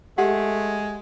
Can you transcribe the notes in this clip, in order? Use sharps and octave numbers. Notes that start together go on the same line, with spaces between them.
G#3 A3 G4 F#5